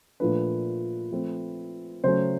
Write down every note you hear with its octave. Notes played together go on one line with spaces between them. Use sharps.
A#2 F3 A3 D4 B4
F3 A3 C4
C#3 F#3 A3 C#4 C5